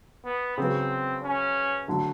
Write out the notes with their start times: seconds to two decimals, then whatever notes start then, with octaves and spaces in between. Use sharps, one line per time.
0.25 B3
0.58 C#3 F#3 B3 C4
1.23 C#4
1.87 D3 F#3 A3